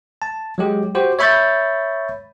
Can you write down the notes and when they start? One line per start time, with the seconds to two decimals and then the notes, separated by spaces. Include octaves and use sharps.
0.22 A5
0.58 F#3 G#3 G4
0.95 F#4 G4 C5
1.19 C#5 E5 B5 C#6 G6 A6